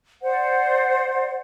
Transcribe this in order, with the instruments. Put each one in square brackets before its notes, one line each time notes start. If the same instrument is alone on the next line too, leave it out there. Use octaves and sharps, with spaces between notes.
[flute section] C5 D5 F#5